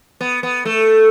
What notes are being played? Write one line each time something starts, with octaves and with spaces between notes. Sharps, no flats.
B3
B3
A3